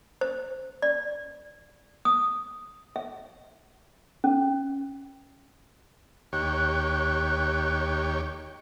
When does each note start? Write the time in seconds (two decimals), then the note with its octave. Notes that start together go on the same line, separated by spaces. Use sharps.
0.21 C5
0.82 D5
2.05 D#6
2.96 E5
4.24 C#4
6.33 D#2 G4 C#5 F#6